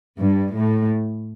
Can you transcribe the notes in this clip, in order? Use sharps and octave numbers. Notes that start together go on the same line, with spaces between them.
G2
A2